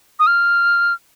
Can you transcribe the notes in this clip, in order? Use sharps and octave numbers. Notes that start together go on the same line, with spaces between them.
D#6
F6